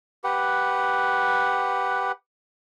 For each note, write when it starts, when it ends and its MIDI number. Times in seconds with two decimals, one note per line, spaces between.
0.24 2.12 67
0.24 2.12 71
0.24 2.12 78